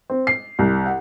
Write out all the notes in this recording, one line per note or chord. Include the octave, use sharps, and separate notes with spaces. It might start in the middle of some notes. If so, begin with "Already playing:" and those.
C4
C7
C2
F#5